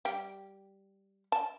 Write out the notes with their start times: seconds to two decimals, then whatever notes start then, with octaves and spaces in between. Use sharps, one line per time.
0.05 G3 G4
1.32 A5